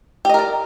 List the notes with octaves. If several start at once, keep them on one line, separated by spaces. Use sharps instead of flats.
G4 A#4 D5 D#5